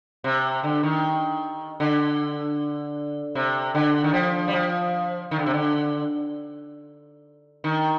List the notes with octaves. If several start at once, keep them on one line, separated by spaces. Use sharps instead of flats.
C3
D3
D#3
D3
C3
D3
D#3
F3
G3
F3
D#3
D3
C3
D3
D#3